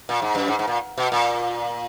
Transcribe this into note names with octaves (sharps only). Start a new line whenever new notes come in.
A#2
G#2
F#2
G#2
G#2
A#2
B2
A#2